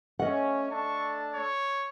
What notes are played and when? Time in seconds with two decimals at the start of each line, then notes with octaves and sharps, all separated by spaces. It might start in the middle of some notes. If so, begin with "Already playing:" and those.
0.20 A3 C#4 D#5 F#5
0.70 D4 A4 A5 C#6
1.34 C#5